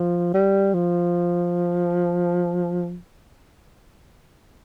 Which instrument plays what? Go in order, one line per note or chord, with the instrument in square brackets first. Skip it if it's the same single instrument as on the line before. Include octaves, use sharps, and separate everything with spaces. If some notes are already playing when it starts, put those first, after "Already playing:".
Already playing: [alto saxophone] F3
G3
F3